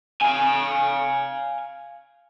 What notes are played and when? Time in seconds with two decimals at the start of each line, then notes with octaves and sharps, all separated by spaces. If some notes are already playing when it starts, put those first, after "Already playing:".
0.22 F5 G#5